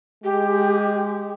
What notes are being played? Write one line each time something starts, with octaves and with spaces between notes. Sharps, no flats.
G#3 G4